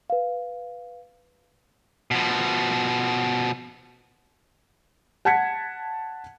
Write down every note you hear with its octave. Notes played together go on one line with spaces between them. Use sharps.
B4 F5
B2 F3
F#5 A5 G#6 B6 C#7